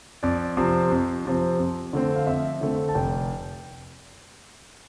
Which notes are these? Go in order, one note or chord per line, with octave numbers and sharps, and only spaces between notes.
F2 D5
C3 F3 C4
F2
C3 F3 C4
F2
D3 A3 C4
F5
F2 E5
D3 A3 C4
A5
F1 G5